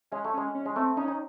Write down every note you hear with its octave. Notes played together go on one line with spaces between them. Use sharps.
G#3 C#4
A3
G#3 C#4
C#4
G#3
A3 C4
C#4 D#4
D#4